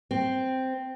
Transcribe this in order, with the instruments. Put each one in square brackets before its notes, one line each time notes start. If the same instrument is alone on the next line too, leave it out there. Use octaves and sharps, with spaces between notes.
[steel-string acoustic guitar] C4